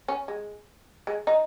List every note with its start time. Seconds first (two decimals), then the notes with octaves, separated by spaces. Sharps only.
0.08 C#4
0.28 G#3
1.07 G#3
1.27 D#4